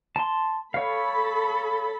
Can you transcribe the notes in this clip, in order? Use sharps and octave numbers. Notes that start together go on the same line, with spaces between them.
A5 C6
A4 C#5 F5 B5